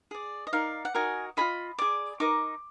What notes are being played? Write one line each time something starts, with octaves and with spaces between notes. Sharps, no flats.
G#4 D5
D#5
D#4 A#4 D5 F5
F#5
D#4 F#4 A#4 D#5 G#5
F4 G#4 D#5 B5
G#4 D5 D6
D#4 A#4 D#5 D6